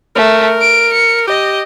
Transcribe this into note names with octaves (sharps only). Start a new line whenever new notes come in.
A3 A#4
D7
C#7
G4 D#5